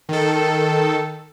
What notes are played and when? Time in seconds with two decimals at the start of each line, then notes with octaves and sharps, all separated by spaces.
0.09 D#3 A4